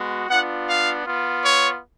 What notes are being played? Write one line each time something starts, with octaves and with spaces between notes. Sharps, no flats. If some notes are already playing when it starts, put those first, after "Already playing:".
Already playing: G#3 B3 F#4
B3 D4 F4 F#5
F5
B3 F4
C#5